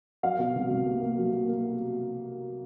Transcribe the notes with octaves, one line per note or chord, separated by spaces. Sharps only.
F#3 F5
B2
C2
C2
A#3
A#3
F#3
A#3
A#3